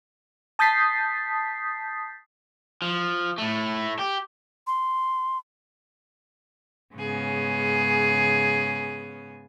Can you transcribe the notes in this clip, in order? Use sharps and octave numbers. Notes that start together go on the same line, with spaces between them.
A5 D#6 G6 A6 B6 C7
F3
A2 A3
G4
C6
G#2 C#3 B3 C#4 G#4